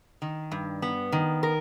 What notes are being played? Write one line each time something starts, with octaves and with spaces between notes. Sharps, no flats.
D#3
G2
B3
D#3
A#4